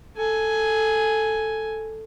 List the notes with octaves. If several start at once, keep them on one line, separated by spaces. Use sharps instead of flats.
A4 G#5